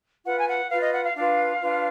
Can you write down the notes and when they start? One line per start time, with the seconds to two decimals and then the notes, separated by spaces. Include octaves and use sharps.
0.23 F4 B4 F#5
0.38 G#5
0.47 F#5
0.69 F4 B4 F5
0.82 D#5
0.92 F#5
1.05 F5
1.16 D4 F4 B4 F5
1.62 D4 F4 B4